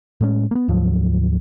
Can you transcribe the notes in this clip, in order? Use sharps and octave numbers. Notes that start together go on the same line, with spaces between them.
A2 G#3 C#4
A#3 B3
D2 G#2 F3 F#3